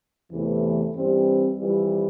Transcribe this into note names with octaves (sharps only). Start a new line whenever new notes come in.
E2 C3 E3 A3
G2 E3 G3 C4
F2 E3 G3